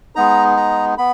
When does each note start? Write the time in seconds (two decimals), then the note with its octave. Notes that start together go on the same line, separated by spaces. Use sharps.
0.15 G#3 B3 D#4 A#5
0.57 A#5
0.98 B3 B5